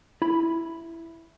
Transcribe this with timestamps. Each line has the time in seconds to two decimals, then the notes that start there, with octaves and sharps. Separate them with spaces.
0.22 E4 B5